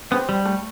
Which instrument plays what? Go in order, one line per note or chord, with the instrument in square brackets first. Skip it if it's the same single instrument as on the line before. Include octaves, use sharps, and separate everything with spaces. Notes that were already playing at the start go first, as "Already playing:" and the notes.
[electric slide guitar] B3 [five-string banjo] C4 G4
[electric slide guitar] G3
[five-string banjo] A3